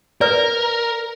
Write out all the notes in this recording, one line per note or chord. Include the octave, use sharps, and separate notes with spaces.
A#4 B4 D5